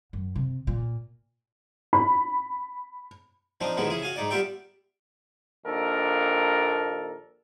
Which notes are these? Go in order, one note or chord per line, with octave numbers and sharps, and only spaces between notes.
F#2
C3
A#2
B5
F3 C4 D4 D#4
A1 F2 D#3 E3 G#3 B3
C#3 E4 G#4
F#4 F5 G#5
G#2 D#4 D5
G3 B3 F4 G4 E5 G5
A#1 D#2 D4 A4 A#4